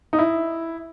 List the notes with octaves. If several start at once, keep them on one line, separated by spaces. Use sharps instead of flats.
D#4
E4